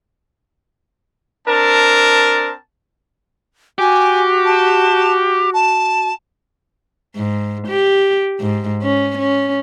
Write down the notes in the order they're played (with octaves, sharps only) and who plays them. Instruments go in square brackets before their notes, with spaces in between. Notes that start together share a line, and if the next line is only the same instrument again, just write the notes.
[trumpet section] C4 D4 A#4 A5
[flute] F#4 [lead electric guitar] G4 [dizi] G#5
[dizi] A5
A5
[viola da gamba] G#2
G4
G#2
C#4
C#4